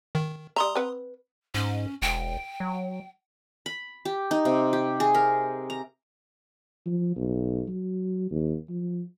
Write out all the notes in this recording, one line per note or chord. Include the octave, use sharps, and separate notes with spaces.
D#3
G3 E5 A#5 C6 D#6
C4 B4 F#5
G#2 C#4
E1 G5
F#3
B5
G4
D#4
C3
G4
G#4
A#4
A#5
F3
B1
F#3
D#2
F3